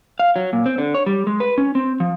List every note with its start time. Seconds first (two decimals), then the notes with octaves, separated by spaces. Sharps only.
0.19 F5
0.36 F#3
0.53 A#2
0.66 C4
0.78 D3
0.94 C#5
1.06 G3
1.27 G#3
1.40 B4
1.58 C#4
1.75 C4
2.00 F3